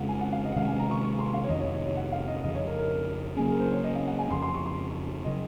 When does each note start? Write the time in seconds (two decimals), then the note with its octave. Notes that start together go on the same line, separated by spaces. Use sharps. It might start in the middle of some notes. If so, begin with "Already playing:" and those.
Already playing: F2 C#3 G#3 C#4 F5 F#5
0.09 G#5
0.21 F#5
0.33 F5
0.45 D#5
0.52 F#5
0.56 C3 D#3 G#3 C#4 F5
0.68 G#5
0.79 A#5
0.91 C#6
1.03 C#6
1.19 C6
1.34 F5
1.44 C#5
1.49 F2 C3 D#3 D#5
1.61 C#5
1.73 C#5
1.85 C#5
1.97 F#5
2.12 F5
2.28 D#5
2.43 F2 C#3 F3 D#5
2.55 C#5
2.67 A#4
2.79 A#4
3.37 C#3 F#3 A#3 C#4 G#4
3.48 A#4
3.60 C5
3.72 C#5
3.84 D#5
3.95 F5
4.07 F#5
4.19 G#5
4.31 F2 C#3 F3 C6
4.42 C6
4.54 C#6
4.66 C6
5.24 C#3 F#3 D#5